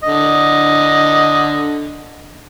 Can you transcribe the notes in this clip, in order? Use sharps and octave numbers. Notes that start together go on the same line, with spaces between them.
D3 D#5